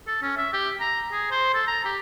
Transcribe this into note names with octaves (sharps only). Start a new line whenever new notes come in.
A4
C#4
E5
G4
A#5
G#4
C5
A4
A#5
G4